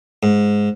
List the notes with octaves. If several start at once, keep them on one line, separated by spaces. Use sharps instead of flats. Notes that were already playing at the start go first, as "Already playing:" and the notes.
G#2